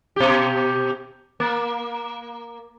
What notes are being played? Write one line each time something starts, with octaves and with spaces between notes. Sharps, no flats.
B2 G4
A#3